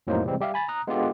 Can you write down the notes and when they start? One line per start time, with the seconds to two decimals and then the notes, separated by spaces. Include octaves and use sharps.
0.07 F2 A2 F#3 A#3 D#4 C5
0.23 C3 E3 G3 G#3 C4
0.40 G3 G4 E5 F5
0.54 G#5 B5 A6
0.68 A#5 D#6 F#6
0.87 G#3 B3 D4 F4 G4 A4